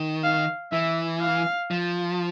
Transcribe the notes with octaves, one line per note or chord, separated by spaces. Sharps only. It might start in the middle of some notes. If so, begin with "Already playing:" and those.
Already playing: D#3
F5
E3 E5
F5
F3